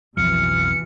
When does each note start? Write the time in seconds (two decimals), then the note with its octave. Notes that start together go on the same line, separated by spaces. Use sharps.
0.17 B1 F2 B2 E3 F3 F6 C#7